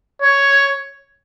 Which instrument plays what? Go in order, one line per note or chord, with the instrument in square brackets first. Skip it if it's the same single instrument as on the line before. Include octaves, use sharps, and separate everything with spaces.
[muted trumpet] C#5